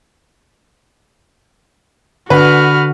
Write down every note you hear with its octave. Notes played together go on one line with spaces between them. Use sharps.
D3 F#4 B4 F6